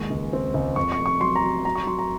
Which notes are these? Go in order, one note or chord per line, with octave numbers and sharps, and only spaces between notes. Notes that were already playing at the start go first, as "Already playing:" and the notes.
Already playing: D#2 G#3 C#6
C#2
C4
C#2
F2 C#6
C#6
F1
C#6
F#3 C6
A#5
F#3
F#3 A#5
C#6
F#3 C6
A#5